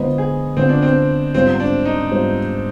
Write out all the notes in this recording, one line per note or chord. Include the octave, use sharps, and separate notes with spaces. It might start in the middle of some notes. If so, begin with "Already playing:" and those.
Already playing: D3 G#3 B3 F4 C5 D#5
G#4
D3 G#3 B3 C4 F4 C5
D4
C4
G#2 G3 B3 C4 F4 C5
D4
D#4
G#2 G3 B3 F4 C5